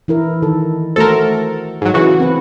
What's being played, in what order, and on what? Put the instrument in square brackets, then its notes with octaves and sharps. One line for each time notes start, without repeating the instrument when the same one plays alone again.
[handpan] E3 E4 A#4
D#3 A4
[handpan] A3 F#4 C5 [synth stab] A4 A#4
[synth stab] G#2 F#3
C#3 E3 F#4
[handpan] C4 B4